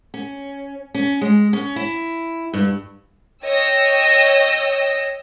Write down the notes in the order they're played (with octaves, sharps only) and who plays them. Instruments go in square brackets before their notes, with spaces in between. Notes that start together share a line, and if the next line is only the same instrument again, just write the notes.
[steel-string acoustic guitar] C#4
C#4
G#3
C#4
E4
G2
[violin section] C#5 D#5 G5 E6 A#6